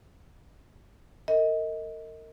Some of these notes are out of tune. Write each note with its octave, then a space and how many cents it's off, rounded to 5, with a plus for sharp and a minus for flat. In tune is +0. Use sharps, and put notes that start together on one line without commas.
A#4 -35 D#5 +25